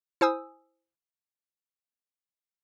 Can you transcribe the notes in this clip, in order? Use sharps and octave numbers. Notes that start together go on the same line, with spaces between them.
E4 C5 G#5 D#6 E6